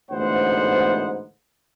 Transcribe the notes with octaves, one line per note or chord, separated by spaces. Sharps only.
A1 D2 G#2 B3 C5 F#5